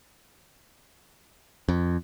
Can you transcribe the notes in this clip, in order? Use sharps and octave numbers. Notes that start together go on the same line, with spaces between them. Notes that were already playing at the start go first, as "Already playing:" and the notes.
F2